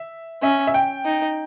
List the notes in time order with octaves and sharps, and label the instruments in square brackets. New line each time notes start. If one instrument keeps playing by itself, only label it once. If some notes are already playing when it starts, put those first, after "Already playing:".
Already playing: [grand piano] E5
[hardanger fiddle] C#4 [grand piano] E5
[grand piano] E5
G5
[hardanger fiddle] D#4